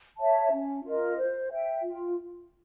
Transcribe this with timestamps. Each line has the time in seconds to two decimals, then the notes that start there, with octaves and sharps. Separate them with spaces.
0.18 C#5 E5 A5
0.51 C#4
0.84 F4 A#4 D#5
1.16 C5
1.49 E5 G5
1.83 F4